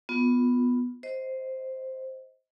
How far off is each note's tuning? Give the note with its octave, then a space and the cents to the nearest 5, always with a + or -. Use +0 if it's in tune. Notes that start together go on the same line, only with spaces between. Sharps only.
B3 +0 F4 +15
C5 +0 D#5 +25